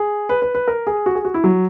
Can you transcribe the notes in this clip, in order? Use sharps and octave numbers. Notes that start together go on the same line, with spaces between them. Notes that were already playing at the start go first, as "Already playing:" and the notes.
Already playing: G#4
B4
B4
B4
A#4
G#4
F#4
G#4
F#4
E4
F#3